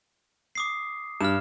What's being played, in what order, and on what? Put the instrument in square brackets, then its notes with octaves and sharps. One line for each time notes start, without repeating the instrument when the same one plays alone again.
[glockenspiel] D6 D#6 C7
[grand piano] G2 [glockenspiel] F6 E7